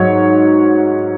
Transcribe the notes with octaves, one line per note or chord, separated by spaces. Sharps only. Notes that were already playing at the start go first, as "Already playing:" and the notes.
Already playing: G#2 F#3 C#5